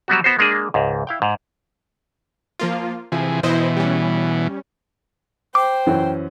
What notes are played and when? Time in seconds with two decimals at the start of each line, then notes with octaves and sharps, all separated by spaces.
0.08 F#3 G3 B3 F#4
0.24 B3 F#4 C5
0.39 G#3 A#3 D4 G#4
0.74 C#2 G#2
1.07 E4 F5 G5
1.22 G#2
2.59 F3 A#3 F4
3.12 C3 E3 F3 G#4
3.43 B2 E3 E4 C5 D#5
3.77 G3 C#4
5.55 C5 G5 D6
5.87 F#2 E3 C#4